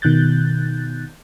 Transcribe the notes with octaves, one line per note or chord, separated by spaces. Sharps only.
B2 D#3 F#6 G6 A6